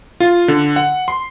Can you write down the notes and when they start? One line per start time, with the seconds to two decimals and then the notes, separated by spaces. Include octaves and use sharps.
0.20 F4
0.48 D3
0.76 F#5
1.08 C6